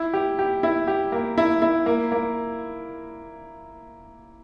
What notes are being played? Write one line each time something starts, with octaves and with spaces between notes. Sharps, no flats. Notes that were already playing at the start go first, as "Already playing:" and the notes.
Already playing: E4
G4
G4
E4
G4
A#3
E4
E4
A#3
A#3